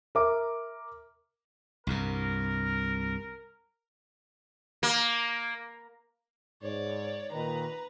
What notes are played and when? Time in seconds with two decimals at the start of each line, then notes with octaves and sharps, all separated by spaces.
0.15 A#4 E5 D6
1.87 C2 G2 C3 A#4
4.83 A#3
6.62 G#2 C#5 D5
7.32 A#2 D#3 B4 A#5